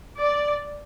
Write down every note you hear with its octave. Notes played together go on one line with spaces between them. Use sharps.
D5